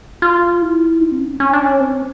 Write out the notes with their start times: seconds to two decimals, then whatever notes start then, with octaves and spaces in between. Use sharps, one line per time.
0.22 F4
0.62 E4
1.01 D#4
1.12 C4
1.20 C#4
1.40 C#4
1.53 D4
1.61 C#4
1.80 C4